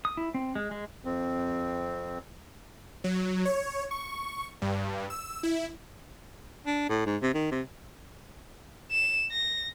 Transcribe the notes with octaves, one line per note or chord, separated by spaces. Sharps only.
D#6
E4
C4
G#3
G#3
F2 C4
F#3
C#5
C#6
G2
E6
E4
D4
A2
G#2
C3
D#3
C3
E7
A#6